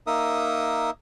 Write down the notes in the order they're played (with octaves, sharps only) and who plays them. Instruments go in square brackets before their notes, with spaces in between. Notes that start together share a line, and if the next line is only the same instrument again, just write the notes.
[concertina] A#3 D#4 A#4 E5 D#6